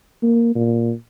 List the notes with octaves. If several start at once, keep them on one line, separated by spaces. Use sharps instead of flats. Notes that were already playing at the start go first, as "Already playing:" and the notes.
A#3
A#2